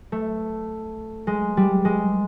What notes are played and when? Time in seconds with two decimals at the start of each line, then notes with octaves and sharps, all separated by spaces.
0.12 A3
1.27 G#3
1.57 G3
1.85 G#3